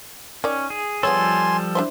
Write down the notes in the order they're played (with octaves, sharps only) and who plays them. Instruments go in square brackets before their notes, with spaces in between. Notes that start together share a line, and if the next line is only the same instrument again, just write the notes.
[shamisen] D#3 D5 [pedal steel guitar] C#4
[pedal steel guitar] G#4
[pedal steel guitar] F3 G3 A4 [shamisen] B3 G#4 C#5 [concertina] G#5 C6
[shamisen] D4 E4 C5